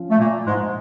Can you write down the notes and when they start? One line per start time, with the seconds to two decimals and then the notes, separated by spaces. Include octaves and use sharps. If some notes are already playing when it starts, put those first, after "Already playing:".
Already playing: F3 C#4 F4
0.10 A3
0.19 A#2 A#3
0.46 G#2 G#3